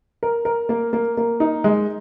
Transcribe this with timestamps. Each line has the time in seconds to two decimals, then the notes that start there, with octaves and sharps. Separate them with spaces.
0.23 A#4
0.45 A#4
0.69 A#3
0.93 A#3
1.17 A#3
1.40 D#4
1.64 G#3